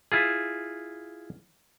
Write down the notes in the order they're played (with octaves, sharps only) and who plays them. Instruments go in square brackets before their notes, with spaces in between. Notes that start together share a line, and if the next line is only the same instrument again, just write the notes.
[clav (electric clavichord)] E4 F4 G#4